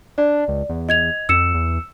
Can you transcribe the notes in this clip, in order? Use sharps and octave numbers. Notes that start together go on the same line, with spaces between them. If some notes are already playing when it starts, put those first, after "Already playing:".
D4 D5
C#2
E2
D#5 G#6 F7
F2 E6 C#7 E7
E2